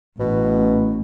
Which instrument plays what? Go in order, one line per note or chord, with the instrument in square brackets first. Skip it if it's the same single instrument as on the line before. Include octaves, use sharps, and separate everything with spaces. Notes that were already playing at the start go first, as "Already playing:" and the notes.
[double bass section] A1 [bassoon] B2